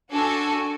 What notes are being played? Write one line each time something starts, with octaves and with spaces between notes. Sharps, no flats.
D4 F#4 A4 G#5